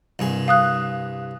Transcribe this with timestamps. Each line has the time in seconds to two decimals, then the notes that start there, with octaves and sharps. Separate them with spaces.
0.19 C2 G2 G#4
0.48 F5 D#6 F#6